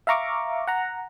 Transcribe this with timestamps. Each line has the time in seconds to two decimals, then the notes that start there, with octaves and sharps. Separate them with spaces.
0.07 E5 F5 A#5 C#6 D6
0.67 F#5 A#5